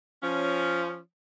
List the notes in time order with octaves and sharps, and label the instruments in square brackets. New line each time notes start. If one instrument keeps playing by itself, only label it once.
[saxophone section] F3 C#4